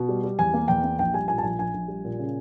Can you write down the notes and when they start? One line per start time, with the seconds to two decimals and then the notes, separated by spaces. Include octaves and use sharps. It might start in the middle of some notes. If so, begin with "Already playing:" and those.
Already playing: B2
0.09 G3
0.24 G3
0.39 E2 G#5
0.54 A#3
0.68 E2 G5
0.84 A#3
0.98 A#1 G5
1.14 G3 G#5
1.28 A#2 G#5
1.38 A5
1.43 A#1 G#5
1.59 A#1 G#5
1.74 A#1
1.88 G3
2.05 A#2
2.19 C#3